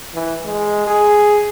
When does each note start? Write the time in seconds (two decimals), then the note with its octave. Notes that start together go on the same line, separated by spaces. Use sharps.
0.15 E3
0.45 G#3
0.87 G#4